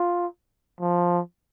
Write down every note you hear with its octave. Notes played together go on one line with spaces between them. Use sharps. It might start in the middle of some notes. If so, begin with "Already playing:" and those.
Already playing: F4
F3